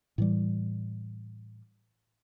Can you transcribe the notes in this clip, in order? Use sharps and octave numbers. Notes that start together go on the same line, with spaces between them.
A2 E3 G3